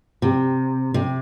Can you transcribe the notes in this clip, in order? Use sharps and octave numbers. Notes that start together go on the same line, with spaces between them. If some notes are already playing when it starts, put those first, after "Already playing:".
C3
C3